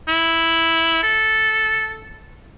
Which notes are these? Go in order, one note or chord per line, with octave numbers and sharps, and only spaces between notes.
E4
A4